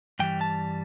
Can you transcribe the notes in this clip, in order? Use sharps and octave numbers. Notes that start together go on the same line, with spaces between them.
G2 E3 G3 G5
A5